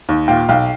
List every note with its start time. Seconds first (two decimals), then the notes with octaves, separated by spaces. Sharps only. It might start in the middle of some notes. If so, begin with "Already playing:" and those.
0.09 D#2
0.28 A#2 F5 G5
0.49 B1 F5 G5